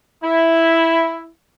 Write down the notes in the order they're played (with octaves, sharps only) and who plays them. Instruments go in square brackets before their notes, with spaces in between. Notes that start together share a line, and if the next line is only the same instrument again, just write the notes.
[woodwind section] E4